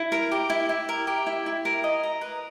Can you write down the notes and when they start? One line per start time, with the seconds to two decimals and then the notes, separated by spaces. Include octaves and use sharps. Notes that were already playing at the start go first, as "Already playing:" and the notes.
Already playing: E4
0.12 A#4
0.32 G4
0.50 E4
0.69 E4
0.89 A#4
1.07 G4
1.26 E4
1.46 E4
1.65 A#4
1.84 D#5
2.03 A#5
2.21 B4